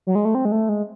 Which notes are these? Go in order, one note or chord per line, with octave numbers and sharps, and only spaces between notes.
F#3
G#3
A3
C4
G#3
A3
G#3